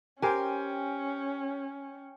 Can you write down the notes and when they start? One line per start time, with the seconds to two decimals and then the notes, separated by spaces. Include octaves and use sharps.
0.22 C#4 G4 A#4 C5 G5 G#5